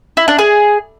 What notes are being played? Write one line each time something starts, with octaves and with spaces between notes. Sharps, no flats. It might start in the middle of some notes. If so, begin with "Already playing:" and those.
E4
D4
G#4